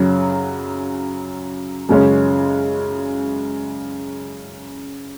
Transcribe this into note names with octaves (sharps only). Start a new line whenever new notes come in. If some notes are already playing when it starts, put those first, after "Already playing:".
Already playing: F#2 C#3 F#3 C#4
F#2 C#3 G#3 C#4